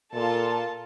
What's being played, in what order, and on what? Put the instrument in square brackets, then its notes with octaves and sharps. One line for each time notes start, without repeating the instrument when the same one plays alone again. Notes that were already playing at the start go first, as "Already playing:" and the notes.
[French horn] A#2 [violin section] F4 A4 A5